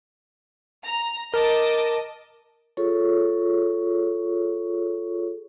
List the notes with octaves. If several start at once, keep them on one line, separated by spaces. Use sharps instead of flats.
A#5
A#4 D#5 A5 D6
F4 G#4 A4 C#5 C#6